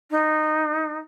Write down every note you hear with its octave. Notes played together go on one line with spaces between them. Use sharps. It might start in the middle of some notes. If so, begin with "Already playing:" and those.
D#4